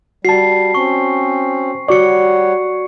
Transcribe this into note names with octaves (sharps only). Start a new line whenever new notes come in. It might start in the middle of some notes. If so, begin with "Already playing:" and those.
G3 F#4 A5 C7
C4 C#4 C#6
G3 F#4 C#5 D5 F#5 C#6 C#7